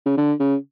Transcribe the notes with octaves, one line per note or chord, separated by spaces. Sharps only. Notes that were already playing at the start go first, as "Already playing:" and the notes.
C#3
D3
C#3